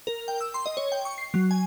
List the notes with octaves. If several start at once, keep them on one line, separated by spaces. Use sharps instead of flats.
A#4
G5
E6
C6
D#5
C#5
G5
C#6
C7
F#3
G#5